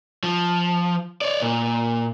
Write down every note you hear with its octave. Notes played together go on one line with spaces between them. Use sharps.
F3
C#5 D5
A#2